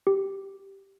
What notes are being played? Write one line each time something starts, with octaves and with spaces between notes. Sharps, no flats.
G4